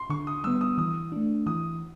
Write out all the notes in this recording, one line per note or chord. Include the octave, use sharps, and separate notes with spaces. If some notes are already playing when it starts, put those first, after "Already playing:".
Already playing: C6
D3 C#6
D#6
G3 B3 E6
D#6
E3 D#6
A3 D4
E3 D#6